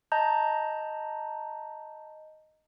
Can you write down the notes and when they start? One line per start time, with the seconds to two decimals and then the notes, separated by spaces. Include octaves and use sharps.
0.12 D#5 A5 A#5 G6